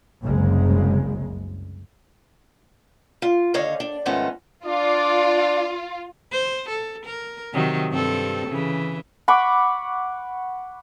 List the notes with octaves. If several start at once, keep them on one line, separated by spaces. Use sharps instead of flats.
F#1 C2 F#2 C#3 G#3
F4
D#2 D3 C#5 D#5 F5
D4
F2 G#2 D#3 A3 B3 C#4
D4 F4 D5
C5
A4
A#4
C3 D#3 F#3
G2 C4 A4
C#3 E3
F#5 B5 C#6 D6